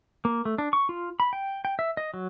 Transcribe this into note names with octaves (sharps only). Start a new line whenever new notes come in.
A#3
A3
D4
C#6
F4
B5
G5
G5
E5
D#5
F#3